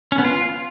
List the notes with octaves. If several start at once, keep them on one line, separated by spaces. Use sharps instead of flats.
C#4
B3
F4